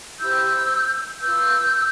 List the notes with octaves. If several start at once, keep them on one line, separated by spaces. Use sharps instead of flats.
E4 G4 C5 E6 G6
F4 B4 E6 G6